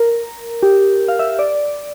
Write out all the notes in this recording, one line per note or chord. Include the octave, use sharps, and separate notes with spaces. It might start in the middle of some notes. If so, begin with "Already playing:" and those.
Already playing: A#4
G4
F5
E5
D5